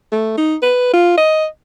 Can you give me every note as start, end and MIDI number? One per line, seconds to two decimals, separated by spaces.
0.12 0.36 57
0.37 0.55 63
0.62 0.92 71
0.93 1.14 65
1.18 1.46 75